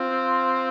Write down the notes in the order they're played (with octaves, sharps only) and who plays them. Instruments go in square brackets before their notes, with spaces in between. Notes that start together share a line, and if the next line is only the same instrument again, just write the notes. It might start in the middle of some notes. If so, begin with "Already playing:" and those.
Already playing: [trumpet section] C4 F4